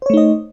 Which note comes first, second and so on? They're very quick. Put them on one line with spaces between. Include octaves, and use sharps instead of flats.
C5 C#5 A3 D#4 D#5